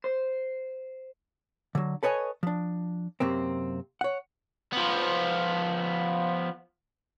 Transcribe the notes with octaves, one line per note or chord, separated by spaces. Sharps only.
C5
D3 F#3
A4 B4 C#5 D#5 G#5
F3 D4
F#2 C3 A#3 C4
C#5 F#5
F3 B3